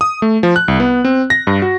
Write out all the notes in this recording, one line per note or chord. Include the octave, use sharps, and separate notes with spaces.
D#6
A3
F3
F#6
C2
B3
C4
A#6
G2
F#4